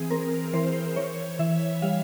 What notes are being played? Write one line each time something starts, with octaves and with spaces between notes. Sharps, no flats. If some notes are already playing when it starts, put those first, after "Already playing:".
Already playing: E3 C4 G#4
C4 A#4
E3 C5
E3 C#5
E3 E5
G3 F5